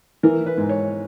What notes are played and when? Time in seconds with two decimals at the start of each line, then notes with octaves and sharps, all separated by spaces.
0.23 E3 A#4
0.46 B4
0.58 G#2
0.69 C#5